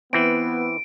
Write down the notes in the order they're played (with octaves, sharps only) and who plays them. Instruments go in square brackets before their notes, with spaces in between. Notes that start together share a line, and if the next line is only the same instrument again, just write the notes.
[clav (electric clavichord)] E3 C4 [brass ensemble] B3 [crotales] D7